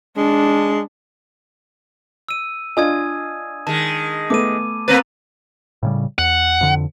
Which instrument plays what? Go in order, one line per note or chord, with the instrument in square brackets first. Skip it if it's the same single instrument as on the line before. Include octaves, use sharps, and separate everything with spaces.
[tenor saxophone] G#3 [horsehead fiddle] D4
[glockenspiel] E6 D#7
[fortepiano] D4 F4 D#5 [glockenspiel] G#5 D#6 G#6
[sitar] D#3 G#3 [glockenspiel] A5
[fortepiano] A3 B3 A4 [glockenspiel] D6 D#7
[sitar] A#3 C4 B4 [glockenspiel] A#5 A6
[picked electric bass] A2 C#3 G3
[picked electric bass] E2 [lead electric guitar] F#5
[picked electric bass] F2 D3